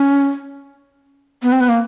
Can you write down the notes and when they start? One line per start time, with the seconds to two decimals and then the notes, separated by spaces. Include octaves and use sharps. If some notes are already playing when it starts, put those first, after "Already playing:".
Already playing: C#4
1.43 B3
1.53 C4
1.60 B3
1.69 A#3